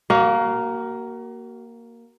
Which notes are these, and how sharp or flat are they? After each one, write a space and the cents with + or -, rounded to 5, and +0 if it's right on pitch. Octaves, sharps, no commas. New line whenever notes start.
A#3 +0 F#4 +35